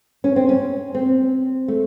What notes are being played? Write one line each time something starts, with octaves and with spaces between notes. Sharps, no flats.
C#4
C4
C#4
C4
A3